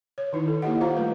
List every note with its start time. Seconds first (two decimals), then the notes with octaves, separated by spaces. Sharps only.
0.18 C#5
0.33 D#3 D#4 E4
0.48 A4
0.62 A#3 E4 G4 D#5 F#5
0.81 F4 C5 F5 A#5
0.96 G3 A3 B4